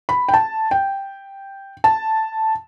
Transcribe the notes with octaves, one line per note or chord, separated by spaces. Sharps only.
B5
G5
A5
G5
A5